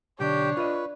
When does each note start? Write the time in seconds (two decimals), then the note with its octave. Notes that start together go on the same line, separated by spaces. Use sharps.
0.20 B1 D3 D4 G4 C#5 G5
0.57 F4 B4 D#5